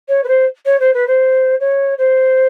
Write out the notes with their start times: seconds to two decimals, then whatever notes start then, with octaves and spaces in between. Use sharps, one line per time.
0.08 C#5
0.23 B4
0.28 C5
0.65 C#5
0.80 C5
0.93 B4
1.07 C5
1.60 C#5
1.98 C5